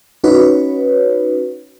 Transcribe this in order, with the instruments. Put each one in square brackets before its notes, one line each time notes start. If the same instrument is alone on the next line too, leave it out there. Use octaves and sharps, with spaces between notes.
[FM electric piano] C#4 D#4 F#4 B4 C#5